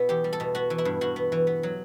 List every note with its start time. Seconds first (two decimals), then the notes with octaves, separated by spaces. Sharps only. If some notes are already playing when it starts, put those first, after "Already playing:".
Already playing: B2 B3 E4
0.09 E2 G4
0.24 G3
0.33 A4
0.40 B2
0.55 B3 F#4
0.70 E3
0.78 E4
0.85 G2
1.01 G2 F#4
1.16 B3
1.32 E3
1.47 B3
1.63 F#3